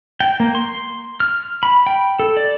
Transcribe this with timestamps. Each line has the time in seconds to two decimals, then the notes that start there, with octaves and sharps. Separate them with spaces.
0.20 G5
0.40 A#3
0.55 C6
1.20 F6
1.63 B5
1.87 G5
2.19 A4
2.37 D5